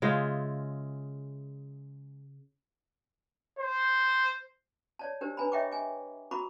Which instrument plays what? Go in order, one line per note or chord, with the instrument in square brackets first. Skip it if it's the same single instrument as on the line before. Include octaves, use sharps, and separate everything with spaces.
[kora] C#3 G#3 F4 E5
[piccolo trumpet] C5
[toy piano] C#5 D5 A5
D4 G4 A#4 C5
D4 B4 G#5 A#5 B5
C#5 D#5 E5 G5 C#6 D6
G#5 D6
F#4 A#4 A#5 B5 C#6 D6